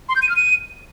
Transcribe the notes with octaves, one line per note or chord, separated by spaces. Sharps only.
C6
G6
D#7
F6
D#7